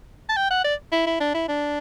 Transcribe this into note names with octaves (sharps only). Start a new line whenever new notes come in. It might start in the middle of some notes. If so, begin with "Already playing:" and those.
A5
G5
F#5
D5
E4
E4
D4
E4
D4